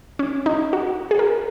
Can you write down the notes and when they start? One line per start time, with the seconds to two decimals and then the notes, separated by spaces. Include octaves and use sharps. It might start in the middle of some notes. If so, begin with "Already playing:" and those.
0.19 C#4
0.46 D#4
0.73 F#4
1.11 G#4
1.19 A#4